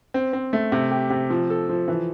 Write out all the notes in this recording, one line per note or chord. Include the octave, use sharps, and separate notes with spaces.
C4
C4
A3
C3
G4
C3
F3
A4
F3
E3